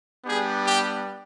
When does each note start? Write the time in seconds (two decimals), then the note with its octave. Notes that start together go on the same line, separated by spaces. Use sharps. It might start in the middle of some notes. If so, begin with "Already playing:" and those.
0.24 G3 B3 D4 G4 G#4
0.66 G4